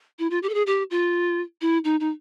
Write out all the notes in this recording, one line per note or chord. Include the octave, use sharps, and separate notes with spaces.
E4
F4
G4
A4
G#4
G4
F4
E4
D#4
D#4